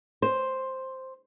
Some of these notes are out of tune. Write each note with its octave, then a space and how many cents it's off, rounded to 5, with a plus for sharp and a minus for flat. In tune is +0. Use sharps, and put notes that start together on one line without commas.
C5 +5